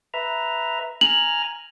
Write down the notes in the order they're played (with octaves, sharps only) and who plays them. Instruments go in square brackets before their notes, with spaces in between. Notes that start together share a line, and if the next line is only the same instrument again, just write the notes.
[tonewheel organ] B4 E5 A#5
[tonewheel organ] G#5 A#5 F6 [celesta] F#7